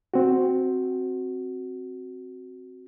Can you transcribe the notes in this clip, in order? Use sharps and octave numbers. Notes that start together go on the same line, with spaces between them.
C4 F#4